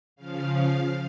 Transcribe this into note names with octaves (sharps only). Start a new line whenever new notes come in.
C#3 F3 F5
F5